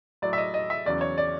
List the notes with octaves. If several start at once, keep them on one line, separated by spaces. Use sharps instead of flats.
A2 F#3 D5
E5
D#5
D#5
E5
E2 C#3 F#3 D5
C#5
D5